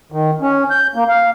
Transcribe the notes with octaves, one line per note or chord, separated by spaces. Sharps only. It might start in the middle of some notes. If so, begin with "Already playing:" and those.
D#3
C#4
G6
A#3
F5